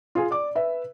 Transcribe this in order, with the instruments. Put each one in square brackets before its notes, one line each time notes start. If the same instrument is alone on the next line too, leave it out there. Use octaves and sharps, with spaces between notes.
[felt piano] F4 G#4 G#5
D5 D6
B4 E5